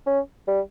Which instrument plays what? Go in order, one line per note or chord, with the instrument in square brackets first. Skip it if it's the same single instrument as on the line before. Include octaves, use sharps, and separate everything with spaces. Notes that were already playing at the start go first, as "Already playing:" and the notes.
[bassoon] C#4
G3